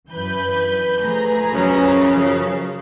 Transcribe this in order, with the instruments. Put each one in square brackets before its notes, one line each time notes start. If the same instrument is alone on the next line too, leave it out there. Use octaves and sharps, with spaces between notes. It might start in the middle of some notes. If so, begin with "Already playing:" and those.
[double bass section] F#2 E3 [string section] B4 G6
[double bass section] F3 A3 [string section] G#4 B4 A#5
[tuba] F#2 [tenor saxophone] C#3 [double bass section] F3